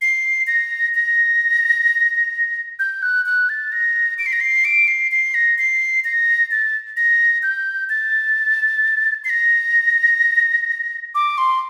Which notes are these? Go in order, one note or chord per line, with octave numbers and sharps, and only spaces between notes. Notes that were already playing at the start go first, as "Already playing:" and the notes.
C7
A#6
A#6
G6
F#6
F#6
A6
A#6
D7
C7
A#6
C7
D7
C7
C7
A#6
C7
A#6
A6
A#6
G6
A6
C7
A#6
D6
C6